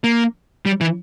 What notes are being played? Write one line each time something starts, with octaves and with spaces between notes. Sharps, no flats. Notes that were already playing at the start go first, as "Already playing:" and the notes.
A#3
G3
E3